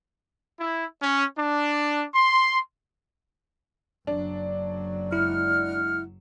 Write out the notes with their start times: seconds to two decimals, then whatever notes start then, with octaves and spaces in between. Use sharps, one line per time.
0.60 E4
1.01 C#4
1.37 D4
2.13 C6
4.07 F#1 F#3 D4
5.13 G#3 E4 F#5 F6